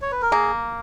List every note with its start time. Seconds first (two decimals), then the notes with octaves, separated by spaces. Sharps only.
0.02 C#5
0.12 B4
0.22 A#4
0.31 A#3 G#4